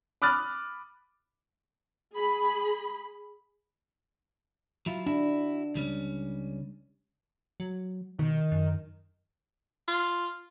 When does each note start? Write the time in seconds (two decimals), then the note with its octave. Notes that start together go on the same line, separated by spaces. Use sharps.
0.22 B5 D6 D#6 F6 F#6 A6
2.14 G#4 B5
4.86 F#3 E4 F4
5.06 D4 E4 F#4
5.75 C#2 G3 C#4
7.60 F#3
8.19 B2 D#3
8.52 F#2
9.88 F4